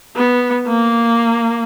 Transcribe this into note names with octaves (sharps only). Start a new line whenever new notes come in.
B3
A#3